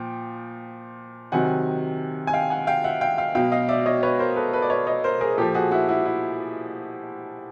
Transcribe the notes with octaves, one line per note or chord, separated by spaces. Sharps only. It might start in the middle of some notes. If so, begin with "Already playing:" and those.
Already playing: A#2 F3 G5
C3 D#3 F#3 F#5 G#5
G#5
F5 G5
F#5 G#5
F5 G5
E5 F#5
F5 G5
F5 G5
B2 F#3 F5 G5
D#5 F5
D5 E5
C#5 D#5
B4 C#5
A#4 C5
A4 B4
A4 B4
D5
B4 C#5
C#5 D#5
A#4 C5
G#4 A#4
A#2 F3 G4 A4
F#4 G#4
E4 F#4
E4 F#4
E4